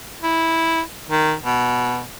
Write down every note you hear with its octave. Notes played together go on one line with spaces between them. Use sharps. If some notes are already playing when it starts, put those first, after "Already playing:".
E4
D#3
B2